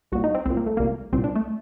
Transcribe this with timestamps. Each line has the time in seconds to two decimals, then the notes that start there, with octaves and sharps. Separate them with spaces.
0.12 C2 F#4
0.15 A#2
0.24 D#4
0.35 C4
0.45 C2 A#2 C4
0.57 A#3
0.67 A3
0.77 C2 A#2 A#3
1.13 C2 A#2 C4
1.24 D4
1.36 A3